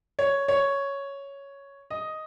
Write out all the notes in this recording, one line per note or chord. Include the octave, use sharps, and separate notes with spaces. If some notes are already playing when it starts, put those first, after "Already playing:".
C#5
C#5
D#5